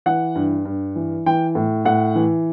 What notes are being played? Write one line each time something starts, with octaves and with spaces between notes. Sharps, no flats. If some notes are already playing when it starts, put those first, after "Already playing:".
E3 F#5
G2
G2
E3
E3 G5
A2
A2 F#5
E3